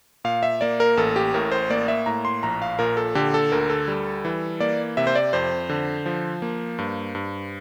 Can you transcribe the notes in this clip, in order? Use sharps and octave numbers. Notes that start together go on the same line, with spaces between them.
A#2 F5
E5
A#3 D5
A#4
A1 A4
G4
A2 A#4
C5
A#3 D5
E5
A2 A#5
C6
A#1 A#5
F5
A#2 A#4
A4
D3 G4
A4
D2 A#4
A4
G3
E3
A#3 D5
C3 E5
C5
D5
F2 C5
D3
F3
A#3
G2
G2